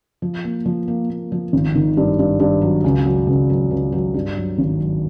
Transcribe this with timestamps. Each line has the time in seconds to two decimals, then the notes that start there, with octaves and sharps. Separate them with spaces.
0.22 F3
0.44 A#3
0.66 F3
0.88 A#3
1.10 A#3
1.32 F3
1.53 G#1
1.75 D#3
1.97 G2
2.19 G2
2.40 G2
2.61 F#3
2.84 C#2
3.05 F#3
3.27 C#2
3.50 F#3
3.71 C#2
3.92 F#3
4.14 G2
4.37 F#3
4.58 G#1
4.80 F#3